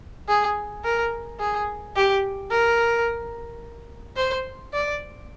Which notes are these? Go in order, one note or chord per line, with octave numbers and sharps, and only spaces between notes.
G#4
A#4
G#4
G4
A#4
C5
D5